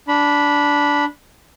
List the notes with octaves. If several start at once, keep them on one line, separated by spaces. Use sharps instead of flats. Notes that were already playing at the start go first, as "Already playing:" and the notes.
D4 B5